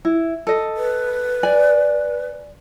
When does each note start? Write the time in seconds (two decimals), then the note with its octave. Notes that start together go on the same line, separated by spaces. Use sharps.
0.05 E4
0.47 A4 D#5
0.77 B4
1.43 D5 G#5